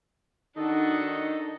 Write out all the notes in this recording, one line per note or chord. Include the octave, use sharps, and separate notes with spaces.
D#3 D4 D#4 F#4 A4 D#5